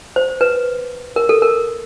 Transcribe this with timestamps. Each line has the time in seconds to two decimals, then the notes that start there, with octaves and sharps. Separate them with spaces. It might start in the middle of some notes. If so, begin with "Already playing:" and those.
0.16 C5
0.41 B4
1.16 A#4
1.29 A4
1.42 A#4